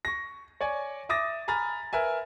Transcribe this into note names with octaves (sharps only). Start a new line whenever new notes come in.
C#6 A#6
C#5 D5 G#5
E5 D6 D#6 A6 A#6
G#5 A#5 B5 F6 A6
A#4 B4 E5 G#5